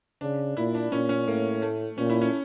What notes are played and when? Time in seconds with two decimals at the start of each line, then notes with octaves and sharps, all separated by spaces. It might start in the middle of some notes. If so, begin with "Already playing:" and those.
0.21 C#3 D4
0.57 A#2 E4
0.75 D4
0.92 A#2 C#4
1.09 C#4
1.27 A2 A#3
1.62 A3
1.98 A#2 C#4
2.10 E4
2.21 C#4